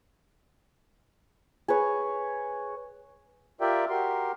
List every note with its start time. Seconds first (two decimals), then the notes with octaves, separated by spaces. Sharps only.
1.68 G#4 B4 C#5
3.61 F4 G4 A#4 D5 E5 G5
3.89 F#4 G4 A#4 C6